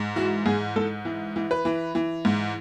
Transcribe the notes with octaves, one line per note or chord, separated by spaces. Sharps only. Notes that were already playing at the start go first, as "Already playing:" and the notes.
Already playing: G#2
E3 F#4
G#2 G#4
G#2 A4
E3
E3
B4
E3
E3
G#2